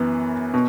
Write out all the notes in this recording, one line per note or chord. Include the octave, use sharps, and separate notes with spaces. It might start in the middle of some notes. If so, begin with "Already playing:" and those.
Already playing: F#2 E3 B3
B2